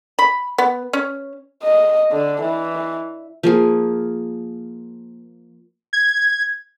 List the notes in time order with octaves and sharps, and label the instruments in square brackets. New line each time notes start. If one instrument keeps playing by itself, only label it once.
[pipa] B5
B3
C#4
[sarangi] D#5
D3
E3
[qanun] F3 A#3 G#4
[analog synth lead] G#6